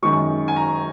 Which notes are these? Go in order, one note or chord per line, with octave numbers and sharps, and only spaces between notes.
F#2 D#3 G#3 C#6
G#5
A#5